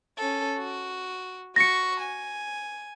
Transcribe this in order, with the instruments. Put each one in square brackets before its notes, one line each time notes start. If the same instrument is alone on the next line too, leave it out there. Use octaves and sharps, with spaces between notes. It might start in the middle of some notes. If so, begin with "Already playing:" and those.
[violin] C#4 A4
F#4
[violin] F#4 C#6 [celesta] A#6 C#7
[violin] G#5